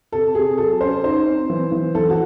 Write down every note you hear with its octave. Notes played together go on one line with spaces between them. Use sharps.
C3 A4
C3 G#4
F#3 A4
C#4 C5
D#4 C5
C4
E3
E3
E3 A4
F#4